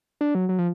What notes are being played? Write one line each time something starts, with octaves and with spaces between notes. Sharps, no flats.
D4
F#3
F#3
F3